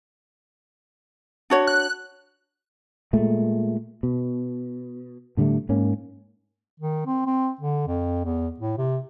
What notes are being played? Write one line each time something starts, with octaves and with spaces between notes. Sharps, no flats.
D4 F#4 C#5
F#6
A#2 G#3 A3
B2
A2 D3 G3 A3
G#2 A#3 C#4
D#3
C4
C4
D3
F2
E2
A2
C3